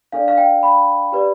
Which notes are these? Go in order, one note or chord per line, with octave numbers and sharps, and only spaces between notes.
D4 A4 D5 F5
F5
G5
B5
G4 B4 D5